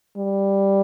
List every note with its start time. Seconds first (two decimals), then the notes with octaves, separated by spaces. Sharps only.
0.17 G3